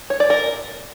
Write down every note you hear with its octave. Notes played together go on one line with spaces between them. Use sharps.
C#5
D5
A#4